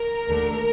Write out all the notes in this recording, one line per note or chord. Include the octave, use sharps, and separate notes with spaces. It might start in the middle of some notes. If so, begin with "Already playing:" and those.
Already playing: A#4
D#2 D3 A3 D4